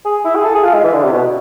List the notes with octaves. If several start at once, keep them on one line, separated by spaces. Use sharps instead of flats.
G#4
E4
G#4
A4
G#4
F4
G#3
E3
D3
C3
B2